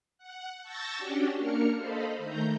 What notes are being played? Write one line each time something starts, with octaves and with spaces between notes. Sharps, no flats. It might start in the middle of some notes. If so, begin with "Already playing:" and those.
F#5
A5 C#6 E6 G6 A6 A#6
C#4 D4 F#4 G4
A#3 D4 A#4 F6 C#7
A4 C5 D#5 F5 B5
D#3 A3 A#5 G6